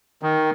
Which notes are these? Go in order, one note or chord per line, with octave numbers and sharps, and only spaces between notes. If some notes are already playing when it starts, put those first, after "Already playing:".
D#3